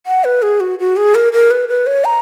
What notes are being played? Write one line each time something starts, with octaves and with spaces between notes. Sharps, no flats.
F#5
B4
G#4
F#4
F#4
G#4
A#4
A#4
B4
B4
C#5
A#5